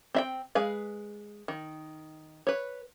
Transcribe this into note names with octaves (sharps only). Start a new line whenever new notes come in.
C4 E5 G5
G#3 G#4 B4 F5
D#3
B4 C#5